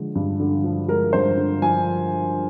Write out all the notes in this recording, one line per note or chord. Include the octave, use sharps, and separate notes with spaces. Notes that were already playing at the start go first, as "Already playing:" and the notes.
Already playing: D3 F3 G#3
G2
D3
F3
G#3 A#4
G2 C5
D3
F3 G#5